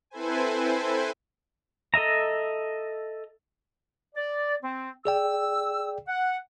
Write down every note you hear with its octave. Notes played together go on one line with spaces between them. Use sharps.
C4 E4 A4 B4 C5 G#5
A4 D#5 E5 A#5
D5
C4
G#4 D5 G5 E6
F#5